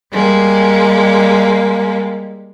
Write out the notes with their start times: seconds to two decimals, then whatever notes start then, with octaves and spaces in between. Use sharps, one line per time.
0.12 G3 G#3 A#3